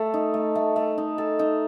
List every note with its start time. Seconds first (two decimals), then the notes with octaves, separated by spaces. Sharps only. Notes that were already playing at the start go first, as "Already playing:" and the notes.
Already playing: A3 A4
0.14 D#4
0.34 A3
0.55 A3
0.76 A3
0.98 D#4
1.18 A4
1.39 D#4